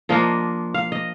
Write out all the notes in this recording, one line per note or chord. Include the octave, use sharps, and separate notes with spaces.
F3 A#3 D4 F4 D#5
F5
D#5